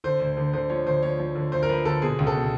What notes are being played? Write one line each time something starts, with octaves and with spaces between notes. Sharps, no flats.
D3 C5
D2
D3
D3 C5
F3 C#5
D2 C5
F3 C#5
F3
D3
D2 C5
A#4
F3 B4
D3 A4
B2 G#4
C#2
A4
B2